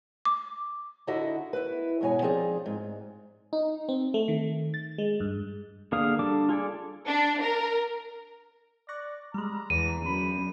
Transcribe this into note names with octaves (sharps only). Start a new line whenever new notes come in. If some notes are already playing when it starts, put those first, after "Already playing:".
D6
D3 D#4 E4 F#4 D#5 E5
E4 B4
E2 G#2 B2 C#5 G#5
F3 C4 D#4 G#4 D5
G#2
D#4
C4
A3
D#3
A6
G#3
G2
D3 A#3 G#4 F5 D#6
G3 D4 A4 D6
F4 G#4 A4 D5
D4
A#4
D5 C#6 F#6 A#6
G3 G#3 A#5
E2 D3 E3 D#7
F#2 B5